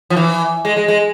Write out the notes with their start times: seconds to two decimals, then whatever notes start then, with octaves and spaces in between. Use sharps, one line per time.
0.10 F3
0.17 E3
0.65 G#3
0.76 G#3
0.88 G#3